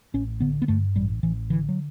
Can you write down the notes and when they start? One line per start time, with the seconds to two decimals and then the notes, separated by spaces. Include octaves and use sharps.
0.14 A1 C#4
0.40 D3 B3
0.62 B3
0.68 G2 A3
0.95 A1 G3
1.23 A1 E3
1.50 D3 E3
1.69 F#3